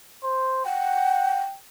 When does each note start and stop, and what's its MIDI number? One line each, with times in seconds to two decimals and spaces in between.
0.24 0.62 72
0.65 1.39 78
0.65 1.56 79